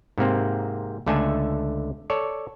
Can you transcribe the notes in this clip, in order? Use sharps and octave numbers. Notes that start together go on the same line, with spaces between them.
G#2 C3 A#3 C4
C#2 D3 A3 A4 G#5
A4 C#5 D5